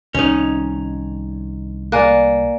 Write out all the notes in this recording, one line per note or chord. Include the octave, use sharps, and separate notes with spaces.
C2 D#3 C#4 D#4
A#3 D5 G#5 F#6